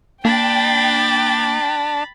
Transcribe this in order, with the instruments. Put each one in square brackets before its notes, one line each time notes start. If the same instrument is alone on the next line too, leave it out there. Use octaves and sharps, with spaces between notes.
[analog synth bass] A#3 [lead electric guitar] D4 [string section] G5 [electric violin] B5 A6